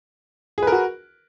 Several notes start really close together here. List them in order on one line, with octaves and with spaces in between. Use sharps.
G#4 B4 A#4 F#4